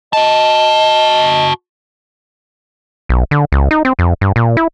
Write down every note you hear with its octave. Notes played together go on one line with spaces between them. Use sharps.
F#4 D#5 A5
B1
D3
C#2
D#4
C4
F2
G2
A#2
E4